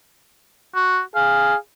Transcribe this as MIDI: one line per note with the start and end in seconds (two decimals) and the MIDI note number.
0.75 1.00 66
1.15 1.56 68
1.15 1.55 77